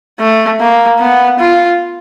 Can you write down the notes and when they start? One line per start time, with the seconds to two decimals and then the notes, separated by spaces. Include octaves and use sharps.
0.20 A3
0.60 A#3
1.00 B3
1.40 F4